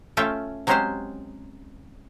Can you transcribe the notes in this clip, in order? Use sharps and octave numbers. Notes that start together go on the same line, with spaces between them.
A3 C#4 F4 E5 G5
F#3 G#3 C4 C#4 G4 C5